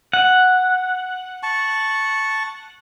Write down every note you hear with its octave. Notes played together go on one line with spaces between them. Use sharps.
F#5
A5 C#6